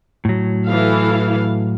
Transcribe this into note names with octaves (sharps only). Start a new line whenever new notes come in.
A2 F#3
E3 A4 F5